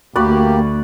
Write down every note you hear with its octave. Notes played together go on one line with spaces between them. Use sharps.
D2 A#3 F#4 G4 B4 D5